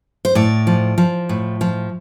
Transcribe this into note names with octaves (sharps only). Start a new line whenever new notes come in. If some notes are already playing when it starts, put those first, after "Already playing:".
C5
A2 D5
F3
F3
A2
F3